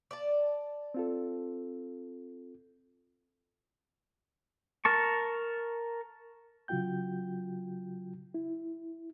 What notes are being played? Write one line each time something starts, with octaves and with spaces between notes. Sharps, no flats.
D5 A5
C4 F4 A4
A#4 A5 C#6
C#3 F#3 F4 F#4 G5 G6
E4